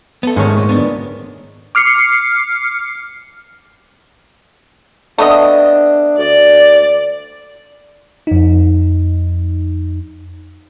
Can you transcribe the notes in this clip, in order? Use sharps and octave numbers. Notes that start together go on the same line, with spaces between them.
B3 A4
G#2 D#3 A3 C#4 C#5
A#2
B3 D4
D6 F6 C7 C#7
A3 B3 D4 D#5
D2 D5
F2 D#4